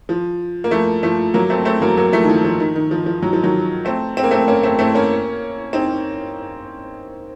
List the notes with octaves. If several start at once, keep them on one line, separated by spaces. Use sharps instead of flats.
F3
A#3
F3 A3
F3 A3
F#3 A#3
A3 C4
A3 C4
F#3 A#3
F#3 A#3
F3 A3
D#3
F3
F3
D#3
D#3
F3
F3
F#3
F3
D#3 F#3
A3 C4
C4
A#3
A3 C4
A#3 C#4
A3 C4
A3 C4
A#3 C#4
C4 D#4